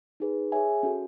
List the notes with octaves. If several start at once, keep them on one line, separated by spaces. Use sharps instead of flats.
D#4 G#4 B4
G#4 C#5 E5 G#5
C#4 F#4 A4